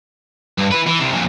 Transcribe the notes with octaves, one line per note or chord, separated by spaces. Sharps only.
G2
E4 B4
E3
C2 C3
F2 A#2